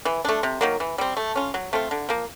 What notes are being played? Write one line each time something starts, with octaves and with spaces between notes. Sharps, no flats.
E3
A3 D4
C3
D#3 F#3 A#3
E3
G3 C4
A3
C#4 F4
F#3
A3 C4 F4
D3
F3 A#3